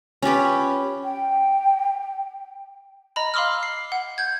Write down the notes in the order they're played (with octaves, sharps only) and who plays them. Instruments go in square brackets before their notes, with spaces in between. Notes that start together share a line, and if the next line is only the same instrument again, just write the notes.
[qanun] C#4 F4 G4 B4
[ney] G5
[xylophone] D#5 A#5 B5
F5 B5 C6 D6 E6 F6
C7
F#5
G6 G#6